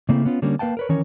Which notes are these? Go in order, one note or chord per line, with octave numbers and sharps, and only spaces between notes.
C#3 A3 A#3 C4 E4
B3 C#4 F4
D3 G3 A#3 C#4
A#3 B4 F5 G5 A5
A#4 B4 C#5
D#3 E3 C#4 A#4 C#5